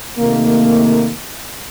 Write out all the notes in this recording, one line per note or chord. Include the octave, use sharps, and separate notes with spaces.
C3 D#3 A3 A#3